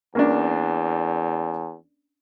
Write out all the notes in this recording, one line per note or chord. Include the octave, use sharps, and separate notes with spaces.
E2 A#3 C#4 D4